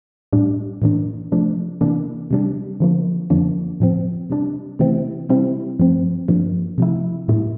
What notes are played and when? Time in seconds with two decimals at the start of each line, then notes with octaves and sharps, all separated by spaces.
0.33 A2 G3 D4
0.82 A2 E3 A#3 D4
1.32 C3 F3 A3 D4
1.81 C3 E3 A#3 D4
2.31 C3 G3 D4
2.80 D3 F3 A#3
3.30 F2 D3 F3 A#3 D4
3.80 A2 F3 C4
4.30 C3 G3 D4
4.79 C3 E3 A3 C4 E4
5.29 C3 G3 C4 E4
5.79 G2 F3 A3 C4
6.28 G2 F3 A#3 D4
6.78 C3 F3 A3 E4
7.28 A2 G3 A#3 E4